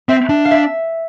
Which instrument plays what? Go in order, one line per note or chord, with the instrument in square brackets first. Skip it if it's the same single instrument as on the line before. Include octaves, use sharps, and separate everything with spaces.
[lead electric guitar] C4 [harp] E5
[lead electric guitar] D4
[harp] F5
E5